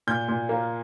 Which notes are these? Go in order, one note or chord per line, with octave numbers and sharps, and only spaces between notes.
A#2 G6
A#2
A#3